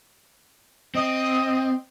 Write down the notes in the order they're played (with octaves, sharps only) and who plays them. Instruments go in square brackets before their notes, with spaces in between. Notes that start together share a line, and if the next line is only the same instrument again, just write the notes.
[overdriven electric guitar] C4 [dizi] D#5